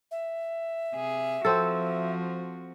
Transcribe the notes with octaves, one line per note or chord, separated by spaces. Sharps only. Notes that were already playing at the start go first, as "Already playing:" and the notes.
E5
C3 G#4
F3 C4 F#4 A4